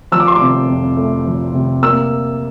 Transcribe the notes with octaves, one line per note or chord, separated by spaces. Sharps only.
F3 E6
D6
C6
D6
C3
F2
A3
F3
C3
A#3 E6